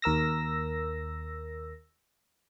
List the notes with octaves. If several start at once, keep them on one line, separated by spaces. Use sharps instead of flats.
D#2 A#4 E6 A#6